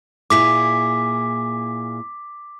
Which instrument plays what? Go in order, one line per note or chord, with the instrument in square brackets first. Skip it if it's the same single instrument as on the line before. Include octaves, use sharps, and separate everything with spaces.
[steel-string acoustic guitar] A#2 E4 G#4 [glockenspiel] D6 B6